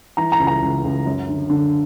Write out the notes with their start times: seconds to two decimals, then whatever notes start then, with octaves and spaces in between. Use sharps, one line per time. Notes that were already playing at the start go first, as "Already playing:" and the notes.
0.17 E3 A#5
0.32 A#5
0.39 C#2
0.47 A#5
0.62 C#2
0.83 C#2
1.06 F#2
1.28 D3
1.50 D3